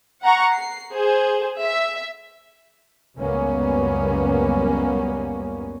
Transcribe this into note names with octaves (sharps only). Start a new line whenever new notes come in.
F#5 A#5 C#6
C7
G#4 C5
E5
C#2 F#2 G3 A#3 B3 C#4